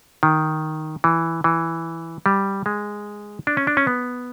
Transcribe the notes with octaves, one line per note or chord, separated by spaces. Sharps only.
D#3
E3
E3
G3
G#3
D4
C#4
D4
C#4
B3